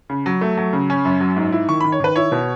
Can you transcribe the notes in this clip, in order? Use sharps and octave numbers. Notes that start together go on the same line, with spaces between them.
C#3
F#3
A3
F#3
C#3
C#4
F#2
F#3
G#2
E4
D#3 C#6
B5
D#3
C#5
D#3 B4
E4 C#5
B2